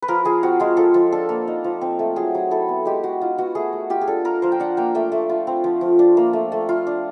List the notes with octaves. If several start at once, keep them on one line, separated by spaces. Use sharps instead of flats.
B4
F3 A#4
F3 G#4
C4 F#4
G#3 F4
F3 A4
F3
D4 A4
A#3
D#4
F3
C4
A3
F#3 G#4
F#3
E4 A4
B3
G#3 G4
G#3 F#4
D#4 F4
B3 F#4
A3 G#4
A3
F4 G4
G#4
D4 A4
F4 A#4
F3 C5
G5
D4 F#5
A#3 G5
A3 G5
A3
F4
C4
F3
F3
D4
A#3
A3
A3
F4
D4